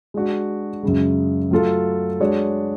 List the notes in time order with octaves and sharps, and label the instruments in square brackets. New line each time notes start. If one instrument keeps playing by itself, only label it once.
[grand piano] G#3 D4 F#4
F#2 C#3 G#3
F#3 A3 F4 A4
G#3 D4 F#4 C#5